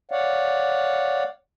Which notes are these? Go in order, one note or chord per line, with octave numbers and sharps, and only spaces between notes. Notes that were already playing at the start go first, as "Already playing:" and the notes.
C#5 D5 F5 F#5